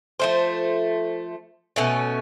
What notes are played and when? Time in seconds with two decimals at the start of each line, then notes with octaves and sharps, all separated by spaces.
0.19 F3 A3 C5
1.76 B2 A3 C#4